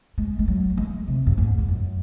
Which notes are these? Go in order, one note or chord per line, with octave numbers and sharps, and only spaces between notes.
G#3
G#3
F#3
G#3
C3
F#2
G#2
F2
F#2